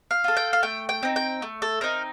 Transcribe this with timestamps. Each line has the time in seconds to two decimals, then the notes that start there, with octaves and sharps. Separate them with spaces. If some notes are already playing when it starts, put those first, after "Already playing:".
0.11 F5
0.24 F4 A4
0.37 G5
0.53 F5
0.63 A3 G5
0.89 G5
1.03 C4 D#4
1.16 G5
1.42 A3
1.62 A4
1.81 C4 D#4 A#4